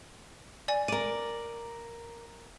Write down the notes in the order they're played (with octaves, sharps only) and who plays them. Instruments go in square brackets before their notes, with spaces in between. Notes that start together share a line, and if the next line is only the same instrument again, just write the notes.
[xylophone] D5 G#5
[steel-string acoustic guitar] A#4 D5 [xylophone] D#7